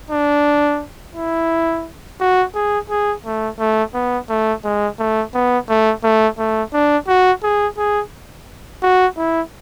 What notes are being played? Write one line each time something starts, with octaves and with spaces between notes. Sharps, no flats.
D4
E4
F#4
G#4
G#4
A3
A3
B3
A3
G#3
A3
B3
A3
A3
A3
D4
F#4
G#4
G#4
F#4
E4